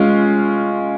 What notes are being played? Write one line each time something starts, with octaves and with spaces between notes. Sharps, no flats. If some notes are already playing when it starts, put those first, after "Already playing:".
Already playing: G#3 C#4 F4